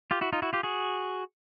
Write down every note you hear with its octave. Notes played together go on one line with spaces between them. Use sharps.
F4 G4
E4 F#4
D#4 F4
E4 F#4
F4 G4
F#4 G#4